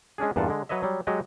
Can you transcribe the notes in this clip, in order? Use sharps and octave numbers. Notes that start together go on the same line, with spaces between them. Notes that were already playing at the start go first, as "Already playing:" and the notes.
G#3 C#4 D4 G#4
E2 G2 A#2 F4 F#5 A5
D3 G#3
F#3 B4 C#5 D#5 E5
F#3 G3
F#3 G#3 F#4 G4 D#5